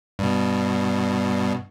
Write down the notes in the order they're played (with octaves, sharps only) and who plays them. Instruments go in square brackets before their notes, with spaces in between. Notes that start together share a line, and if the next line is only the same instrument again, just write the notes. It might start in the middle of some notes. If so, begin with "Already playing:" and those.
[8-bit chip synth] G2 B2